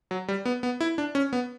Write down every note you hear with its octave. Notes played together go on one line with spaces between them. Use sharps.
F#3
G3
B3
B3
E4
D4
C#4
B3